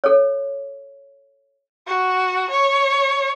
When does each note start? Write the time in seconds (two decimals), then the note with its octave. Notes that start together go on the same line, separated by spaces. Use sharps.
0.04 A4 C#5
1.87 F#4
2.51 C#5